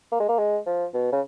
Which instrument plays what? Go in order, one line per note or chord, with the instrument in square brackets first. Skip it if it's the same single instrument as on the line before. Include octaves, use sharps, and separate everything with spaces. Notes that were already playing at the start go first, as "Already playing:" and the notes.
[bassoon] A#3
G#3
A#3
G#3
F3
B2
C#3